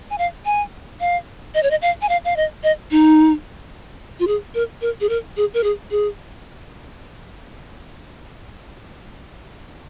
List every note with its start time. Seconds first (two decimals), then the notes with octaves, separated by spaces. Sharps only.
0.10 G#5
0.18 F5
0.45 G#5
1.00 F5
1.55 D#5
1.63 C#5
1.71 D#5
1.82 F5
2.02 G#5
2.09 F5
2.25 F5
2.36 D#5
2.64 D#5
2.91 D#4
4.20 F4
4.27 G#4
4.55 A#4
4.81 A#4
5.01 G#4
5.09 A#4
5.37 G#4
5.54 A#4
5.64 G#4
5.91 G#4